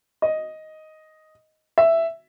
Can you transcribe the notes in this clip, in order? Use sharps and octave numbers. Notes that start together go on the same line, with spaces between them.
D#5
E5